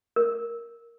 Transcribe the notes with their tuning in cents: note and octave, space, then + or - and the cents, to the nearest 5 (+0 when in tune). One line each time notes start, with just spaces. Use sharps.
A#4 -5